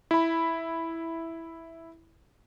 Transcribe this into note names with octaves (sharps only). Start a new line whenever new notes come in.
E4 B5